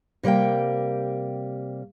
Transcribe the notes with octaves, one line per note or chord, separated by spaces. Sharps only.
C3 G3 A#3 A#4 G5